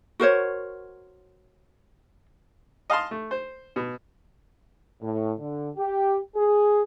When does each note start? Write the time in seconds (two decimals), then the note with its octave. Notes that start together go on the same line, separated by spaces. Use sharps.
0.20 F#4 A#4 C5 C#5
2.90 D#5 F5 A5 C6
3.11 A3
3.31 C5
3.76 B2
5.01 A2
5.38 D3
5.76 G4
6.35 G#4